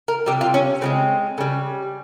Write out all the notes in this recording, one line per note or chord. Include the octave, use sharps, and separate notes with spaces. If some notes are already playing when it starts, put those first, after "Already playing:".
A#4
C3 G3 G4
F4
C#4
C#3 F3 G#3 C4
C#3 G3